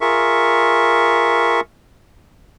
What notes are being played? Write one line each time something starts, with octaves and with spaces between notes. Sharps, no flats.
F4 G#4 A#4 E5 C#6